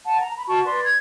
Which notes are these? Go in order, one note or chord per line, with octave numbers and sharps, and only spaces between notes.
F#5 A5
A#5
B5
F#4 A5 C#6
B4 D5 C6
G#6